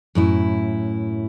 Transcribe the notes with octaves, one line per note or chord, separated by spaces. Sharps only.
F#2 A2 E4